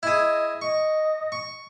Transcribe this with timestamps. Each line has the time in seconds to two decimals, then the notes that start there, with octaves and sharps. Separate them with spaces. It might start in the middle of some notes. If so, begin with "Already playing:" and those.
0.03 E4 G#4 D#5
0.62 D#5 C#6
1.32 C#6